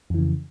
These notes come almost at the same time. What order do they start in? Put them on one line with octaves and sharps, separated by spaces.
F2 E3 C#3